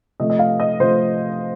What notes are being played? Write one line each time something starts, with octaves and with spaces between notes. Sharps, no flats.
C3 F3 A3 D#5
D#5
F5
D#5
C3 F3 A3 C5